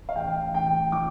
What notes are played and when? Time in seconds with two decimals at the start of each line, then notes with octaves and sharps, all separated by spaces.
0.09 F5
0.16 A1 G5
0.54 A1 G5
0.92 F3 D6